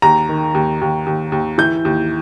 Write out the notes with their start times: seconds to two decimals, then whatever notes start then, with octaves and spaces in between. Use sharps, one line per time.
0.02 D#2 A#5
0.29 D#3
0.55 D#2
0.81 D#2
1.06 D#2
1.32 D#2
1.58 E3 G6
1.85 D#2